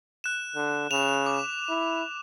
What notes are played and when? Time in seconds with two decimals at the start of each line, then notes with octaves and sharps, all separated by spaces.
0.24 F#6 E7
0.56 D3
0.91 C#3 E7 F7
1.26 D6
1.69 E4